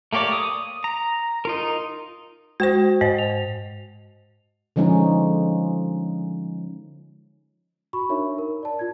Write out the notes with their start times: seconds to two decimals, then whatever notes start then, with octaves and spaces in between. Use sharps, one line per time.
0.13 A3 A#3 G4 C#5 D5
0.32 D#6
0.84 A#5
1.45 D#4 F4 A#4
2.60 G#3 F#4 C5 G5
3.01 G#2 C5 D#5
3.18 F7
4.76 D3 F3 G#3 C#4 D#4
7.93 F#4 B5 C#6
8.09 D4 D#4 A#4 C#5 E5
8.38 A#4
8.63 D5 A5
8.79 F4 G#6